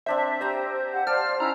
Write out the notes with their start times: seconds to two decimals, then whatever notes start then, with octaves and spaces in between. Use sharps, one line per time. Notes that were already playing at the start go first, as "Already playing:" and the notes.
0.06 C4 D4 C5 E5
0.41 G4 C5 E5 A#5
0.92 G4 F5 F#5
1.07 C5 D5 F5 A5 D6 F6
1.40 C#4 D#4 E4 A#5